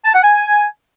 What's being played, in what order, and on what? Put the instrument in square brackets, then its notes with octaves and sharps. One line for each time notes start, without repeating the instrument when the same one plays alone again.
[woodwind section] A5
F#5
G#5